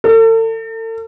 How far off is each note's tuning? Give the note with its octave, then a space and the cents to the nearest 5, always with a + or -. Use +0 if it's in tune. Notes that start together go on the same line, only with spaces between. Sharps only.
A4 +40